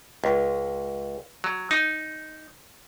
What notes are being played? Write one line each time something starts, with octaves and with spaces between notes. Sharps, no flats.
C#2
F#3
D#4